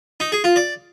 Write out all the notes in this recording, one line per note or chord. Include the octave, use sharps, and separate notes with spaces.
D#4
G#4
F4
D5